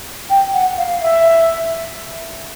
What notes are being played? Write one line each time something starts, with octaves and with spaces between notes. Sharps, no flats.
G5
F#5
F5
E5